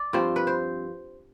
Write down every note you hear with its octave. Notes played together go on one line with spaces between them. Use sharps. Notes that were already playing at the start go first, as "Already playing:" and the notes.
Already playing: D5
G2 F3 C4
B4
C5